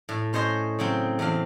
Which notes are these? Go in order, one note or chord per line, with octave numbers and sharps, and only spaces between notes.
A2
C#4 C5 C#5 D#5 C6
C#3 F#3 C4
E2 C4 F5